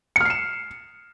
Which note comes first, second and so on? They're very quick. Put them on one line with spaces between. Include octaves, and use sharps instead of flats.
C#7 F6 C7 E7